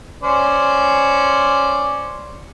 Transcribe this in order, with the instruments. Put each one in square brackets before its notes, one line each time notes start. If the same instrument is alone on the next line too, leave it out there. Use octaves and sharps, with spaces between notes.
[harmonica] C#4 C5 D5